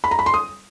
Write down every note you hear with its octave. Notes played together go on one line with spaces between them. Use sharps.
B5
A#5
B5
C6
D#6